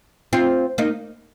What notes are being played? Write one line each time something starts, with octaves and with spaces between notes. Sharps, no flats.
C4 F4
A#3 D#4